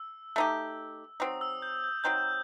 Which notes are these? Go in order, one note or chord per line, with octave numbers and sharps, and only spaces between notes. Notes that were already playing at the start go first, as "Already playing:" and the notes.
Already playing: E6
A3 D#4 G4
F#3 C4 D#4 D#6
E6
G6
G6
F#3 C4 D#4 G6